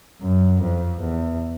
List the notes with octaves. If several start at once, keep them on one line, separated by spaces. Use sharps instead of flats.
F#2
F2
E2